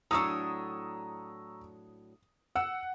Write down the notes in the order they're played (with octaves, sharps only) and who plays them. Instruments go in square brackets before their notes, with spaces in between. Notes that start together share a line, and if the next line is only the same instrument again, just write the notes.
[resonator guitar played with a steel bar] A2 F#3 D4 [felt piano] A#5 C#6 E6 [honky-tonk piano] D#6
[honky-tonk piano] F#5 [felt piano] E6